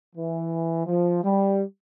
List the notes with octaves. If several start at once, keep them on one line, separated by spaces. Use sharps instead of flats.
E3
F3
G3